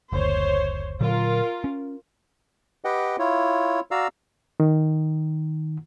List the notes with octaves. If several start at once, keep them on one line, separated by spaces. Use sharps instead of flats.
F#1 D2 C5 C#5
A#2 D3 F#3 F4 A#4
C#4
G4 B4 D#5 F#5 G5
E4 F4 C#5
F#4 D5 F5 A#5 E6
D#3